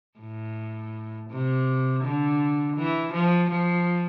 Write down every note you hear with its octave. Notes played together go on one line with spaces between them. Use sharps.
A2
C3
D3
E3
F3
F3